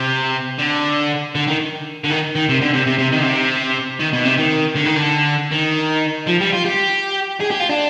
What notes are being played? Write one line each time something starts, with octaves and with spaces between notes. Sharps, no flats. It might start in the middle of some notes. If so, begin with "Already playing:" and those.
Already playing: C3
D3
D3
D#3
D3
D#3
D#3
C3
D3
C3
C3
C3
D#3
D3
C3
D#3
B2
C3
D#3
D3
D#3
D3
D#3
F3
G3
F4
G4
G#4
G4
F4
D4